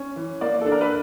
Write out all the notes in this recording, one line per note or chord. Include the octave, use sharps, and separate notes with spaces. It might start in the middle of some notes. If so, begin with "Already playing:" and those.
Already playing: C#4
E3
A#3 D5
D4 A4
A#4
B4